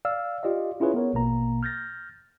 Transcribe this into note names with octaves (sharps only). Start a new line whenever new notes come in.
D5 F5 E6 F6
F4 G4 D5 D#5 F5
C#4 E4 F4 G#4 B4 C#5
B3 A#4 C#5
A#1 B2 A#3 A#5
F6 G6 A6 A#6